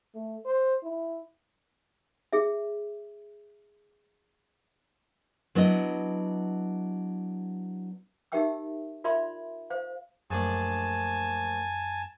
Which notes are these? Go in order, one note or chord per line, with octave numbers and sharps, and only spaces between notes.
A3
C5
E4
G#4 E5
F#3 B3 D4 E4 D#5
D#4 G4 A#4 E5 G5 E6
F4 A#4 D5 E5 B5 C6
C5 F5
A#1 F#2 A2 D4 G#5 A5